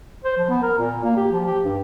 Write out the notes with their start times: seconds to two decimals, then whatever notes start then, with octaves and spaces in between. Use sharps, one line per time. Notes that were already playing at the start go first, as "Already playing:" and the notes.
0.25 C5
0.37 F3
0.50 B3
0.63 A#4
0.78 A#2
1.04 A#3
1.17 G4
1.32 F3
1.46 G4
1.64 G2